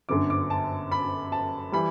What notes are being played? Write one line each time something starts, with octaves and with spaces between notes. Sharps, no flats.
G1 F#2 D3 D6
D6
A5
B5
A5
E3 G3 B5